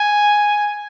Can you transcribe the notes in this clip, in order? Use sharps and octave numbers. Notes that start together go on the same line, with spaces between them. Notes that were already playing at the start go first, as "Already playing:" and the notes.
Already playing: G#5